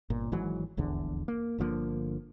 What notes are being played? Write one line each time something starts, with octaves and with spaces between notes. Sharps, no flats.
G1 A#2
G#1 G#2 E3 F#3
D#1 A#1 E2 D3
A#3
G1 D3 F3 A#3